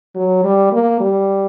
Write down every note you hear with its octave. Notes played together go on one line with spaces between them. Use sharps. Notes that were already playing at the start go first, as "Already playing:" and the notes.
F#3
G3
A#3
G3